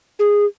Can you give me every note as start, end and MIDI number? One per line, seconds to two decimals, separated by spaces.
0.19 0.45 68